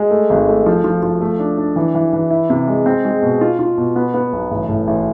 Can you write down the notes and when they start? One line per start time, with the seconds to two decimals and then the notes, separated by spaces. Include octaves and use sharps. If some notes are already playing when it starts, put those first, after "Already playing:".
Already playing: G#3
0.11 A3
0.30 G#1
0.48 A3
0.66 F3
0.84 F3
1.03 F3
1.21 A3
1.39 D4
1.58 D4
1.76 E3
1.95 E3
2.13 E3
2.30 E4
2.50 C3
2.67 G#3
2.86 C4
3.05 G#3
3.22 B2
3.41 F4
3.59 F4
3.78 B2
3.96 B3
4.14 B3
4.33 B1
4.51 A1
4.69 A2
4.87 A1